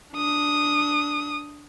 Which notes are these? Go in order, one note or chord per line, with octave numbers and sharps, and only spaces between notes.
D4 D#6